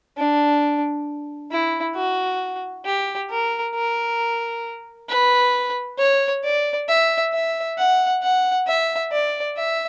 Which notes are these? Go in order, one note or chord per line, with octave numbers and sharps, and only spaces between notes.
D4
E4
F#4
G4
A#4
A#4
B4
C#5
D5
E5
E5
F#5
F#5
E5
D5
E5